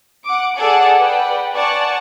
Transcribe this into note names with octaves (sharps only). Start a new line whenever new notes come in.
F#5 D6
G#4 A4 D5 F#5 G#5
B4 D5 F#5 G5
D5 F#5 G#5 A5 C#6